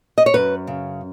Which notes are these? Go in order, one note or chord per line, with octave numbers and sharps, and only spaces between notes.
D#5
C#5
F#2 B4
C#3